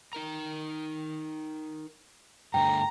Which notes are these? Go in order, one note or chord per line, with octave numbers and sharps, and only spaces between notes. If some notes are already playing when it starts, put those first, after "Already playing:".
D#4 A#4 A#5
G2 D3 A3 G5 A#5